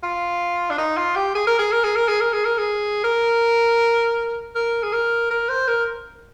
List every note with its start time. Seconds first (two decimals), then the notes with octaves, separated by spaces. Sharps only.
0.03 F4
0.70 D4
0.78 D#4
0.97 F4
1.16 G4
1.35 G#4
1.47 A#4
1.59 G#4
1.72 A#4
1.84 G#4
1.95 A#4
2.08 G#4
2.21 A#4
2.33 G#4
2.45 A#4
2.58 G#4
3.04 A#4
4.55 A#4
4.83 G#4
4.93 A#4
5.30 A#4
5.49 C5
5.68 A#4